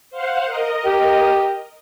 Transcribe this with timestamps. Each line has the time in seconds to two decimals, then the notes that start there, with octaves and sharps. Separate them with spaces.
0.10 C5 F5 F#5
0.45 A#4 D#5
0.86 G4